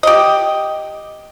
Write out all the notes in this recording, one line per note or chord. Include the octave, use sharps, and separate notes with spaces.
G4 D#5